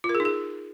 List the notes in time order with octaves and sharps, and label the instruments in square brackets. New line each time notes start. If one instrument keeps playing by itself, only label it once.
[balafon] F4
A#4
G#4
D#4
G#4